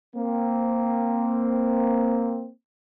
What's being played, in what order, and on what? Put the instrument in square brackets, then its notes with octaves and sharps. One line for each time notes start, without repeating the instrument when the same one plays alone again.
[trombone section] A#3 C4